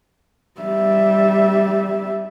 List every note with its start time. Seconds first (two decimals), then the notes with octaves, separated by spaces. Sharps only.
0.60 G3 E5